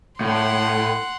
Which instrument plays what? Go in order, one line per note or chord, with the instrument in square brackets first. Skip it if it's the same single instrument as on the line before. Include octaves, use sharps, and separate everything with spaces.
[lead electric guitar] A2 [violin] F#5 C6